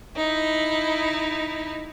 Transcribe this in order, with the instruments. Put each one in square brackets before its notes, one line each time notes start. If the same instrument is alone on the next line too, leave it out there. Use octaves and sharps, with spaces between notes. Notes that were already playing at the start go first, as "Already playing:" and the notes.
[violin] D#4 E4